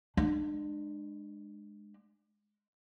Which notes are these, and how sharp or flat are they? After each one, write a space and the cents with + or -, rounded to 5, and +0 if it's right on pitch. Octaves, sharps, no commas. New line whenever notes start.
G#3 +0 D4 +35